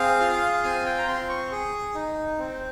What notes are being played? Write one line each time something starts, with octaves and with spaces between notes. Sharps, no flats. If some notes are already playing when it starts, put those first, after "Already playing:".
Already playing: C4 G#4 F5
F4
C4 G#5
G5
A#5
C4 C6
C#6
G#4
D#4
C4